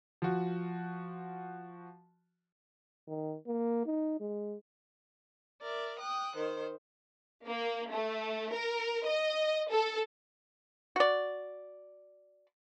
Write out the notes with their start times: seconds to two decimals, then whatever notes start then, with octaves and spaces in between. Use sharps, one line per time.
0.22 F3 F#4
3.08 D#3
3.47 A#3
3.86 D#4
4.20 G#3
5.60 A#4 D5 E5
5.99 G5 D#6 F#6
6.35 D#3 C5
7.46 A#3
7.91 A3
8.52 A#4
9.06 D#5
9.70 A4
10.96 F#4 D5